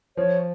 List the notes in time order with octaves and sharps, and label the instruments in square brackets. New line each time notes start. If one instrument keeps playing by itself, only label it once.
[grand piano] F3 [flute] C#5